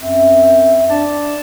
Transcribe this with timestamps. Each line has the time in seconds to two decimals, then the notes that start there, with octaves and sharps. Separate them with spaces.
0.01 F#2 C4 E5
0.89 D4 D5 A5